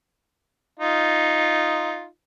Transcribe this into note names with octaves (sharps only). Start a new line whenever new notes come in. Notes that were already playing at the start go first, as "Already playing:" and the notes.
D#4 F4